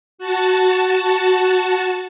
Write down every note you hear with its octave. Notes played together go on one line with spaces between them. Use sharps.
F#4 A5